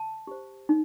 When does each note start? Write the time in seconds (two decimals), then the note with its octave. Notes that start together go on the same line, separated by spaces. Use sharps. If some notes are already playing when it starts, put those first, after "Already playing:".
Already playing: A5
0.27 G4 C5
0.69 D#4